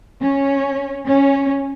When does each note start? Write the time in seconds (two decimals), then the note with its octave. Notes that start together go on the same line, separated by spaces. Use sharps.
0.19 C#4
1.05 C#4